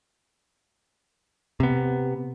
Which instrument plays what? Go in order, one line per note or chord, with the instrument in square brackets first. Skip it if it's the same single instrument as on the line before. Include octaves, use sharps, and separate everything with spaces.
[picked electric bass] C3 B3